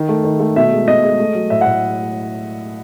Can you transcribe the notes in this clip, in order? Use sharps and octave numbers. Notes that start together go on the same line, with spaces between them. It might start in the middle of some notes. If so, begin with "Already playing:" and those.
Already playing: D#3
A3
D#3
A3
B2 E5
G#3
B2 D#5
G#3
A3
F#3
A2 E5
F#5
A2